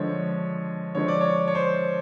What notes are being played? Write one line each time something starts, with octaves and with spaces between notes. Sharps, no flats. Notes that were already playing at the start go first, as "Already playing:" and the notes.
Already playing: D3 F3 G#3 C#5
D3 F3 G#3 C#5
D5
C#5
C#5
C5